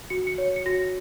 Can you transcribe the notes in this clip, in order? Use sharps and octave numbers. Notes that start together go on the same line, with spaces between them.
F#4 C#7
C#7
C#5
C#7
F#4 A#6